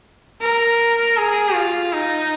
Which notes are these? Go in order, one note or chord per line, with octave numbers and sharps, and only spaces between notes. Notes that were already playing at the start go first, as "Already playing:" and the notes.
A#4
G#4
F4
D#4